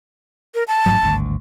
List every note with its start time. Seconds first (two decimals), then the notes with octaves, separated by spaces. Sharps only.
0.55 A#4
0.68 A5
0.86 A1 G#2 F#3
1.03 G#1 D2 G2